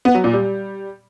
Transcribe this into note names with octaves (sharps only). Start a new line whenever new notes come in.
B3
F#3
A#2
G3